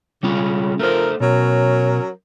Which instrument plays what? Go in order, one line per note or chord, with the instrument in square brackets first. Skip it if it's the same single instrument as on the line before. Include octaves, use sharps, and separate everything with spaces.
[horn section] C#3 [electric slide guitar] G3 C#4 F4
[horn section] F3 A#4 [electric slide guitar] A3 C5
[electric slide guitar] B2 [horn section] F#3 C#4 A#4